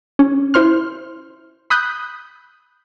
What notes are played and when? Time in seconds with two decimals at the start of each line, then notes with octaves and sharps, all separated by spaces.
0.19 C#4
0.54 E4 C5 C6 F6
1.70 B5 D#6 F#6 G6